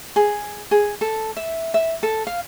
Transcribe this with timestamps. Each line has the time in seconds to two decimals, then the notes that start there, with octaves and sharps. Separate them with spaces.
0.16 G#4
0.71 G#4
1.01 A4
1.37 E5
1.74 E5
2.03 A4
2.27 F5